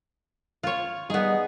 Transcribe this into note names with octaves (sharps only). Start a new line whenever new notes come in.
F4 C#5
G3 B3 D#4 G#4